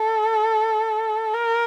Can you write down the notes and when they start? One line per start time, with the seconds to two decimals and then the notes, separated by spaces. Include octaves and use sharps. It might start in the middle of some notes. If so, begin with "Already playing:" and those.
Already playing: A4
1.34 A#4